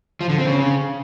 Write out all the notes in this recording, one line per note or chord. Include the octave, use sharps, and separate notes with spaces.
F3
D3
C4
C#3